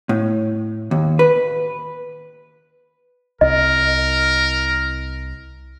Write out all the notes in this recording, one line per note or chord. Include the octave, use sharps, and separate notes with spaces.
A2
D#2
B4
C2 A#4 D#5